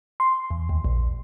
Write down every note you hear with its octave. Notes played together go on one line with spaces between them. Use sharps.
C6
E2
D#2
A#1